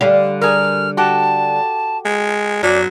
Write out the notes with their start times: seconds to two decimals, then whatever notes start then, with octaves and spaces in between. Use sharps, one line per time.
0.01 D3 G3 F5
0.41 G#4 A#4 F6
0.97 F#4 G4 A4 A5
2.05 G#3
2.63 F#2 F#3 D5